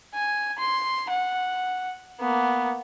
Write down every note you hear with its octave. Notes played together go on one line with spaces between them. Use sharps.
G#5
C6
F#5
A#3 B3